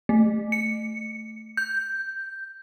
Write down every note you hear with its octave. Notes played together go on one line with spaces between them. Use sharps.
A3
C#7
G6